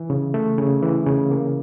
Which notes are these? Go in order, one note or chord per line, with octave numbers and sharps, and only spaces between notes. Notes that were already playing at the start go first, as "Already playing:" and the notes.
Already playing: E3
C#3
A3
C#3
E3
C#3
A#3